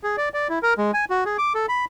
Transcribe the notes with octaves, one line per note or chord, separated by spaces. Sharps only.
G#4
D5
D5
E4
A#4
G#3
G#5
F#4
G#4
D6
A4
B5